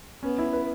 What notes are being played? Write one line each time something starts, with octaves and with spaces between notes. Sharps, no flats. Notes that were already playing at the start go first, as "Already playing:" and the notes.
B3 C#4
E4
B4